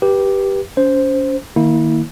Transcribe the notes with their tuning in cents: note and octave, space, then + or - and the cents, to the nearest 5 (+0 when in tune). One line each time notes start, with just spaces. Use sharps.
G4 +0 B4 -20
C#4 +30 C5 +0
D#3 +0 A#3 +0 E4 -25